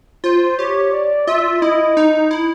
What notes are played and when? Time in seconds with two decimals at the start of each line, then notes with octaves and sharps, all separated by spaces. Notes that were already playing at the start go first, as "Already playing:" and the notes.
0.24 F4 C5
0.58 G4 C#5
0.93 D5
1.27 F4 E5
1.61 E4 D#5
1.97 D#4
2.31 E4